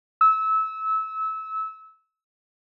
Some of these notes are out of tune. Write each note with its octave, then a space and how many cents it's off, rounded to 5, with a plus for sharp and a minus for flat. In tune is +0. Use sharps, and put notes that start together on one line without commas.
E6 -25